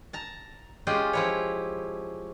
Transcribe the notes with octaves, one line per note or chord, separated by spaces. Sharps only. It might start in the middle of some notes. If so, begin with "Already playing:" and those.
A5 A#5
G#3 C#4 F4 G4
F3 E4 C#5